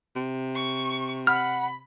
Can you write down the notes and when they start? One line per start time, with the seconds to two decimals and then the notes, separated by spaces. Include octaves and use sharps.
0.16 C3
0.56 C#6
1.27 F#5 B5 F6